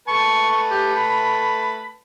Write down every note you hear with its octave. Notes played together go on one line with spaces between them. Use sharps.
A3 B4 A5 C#6
G4
B5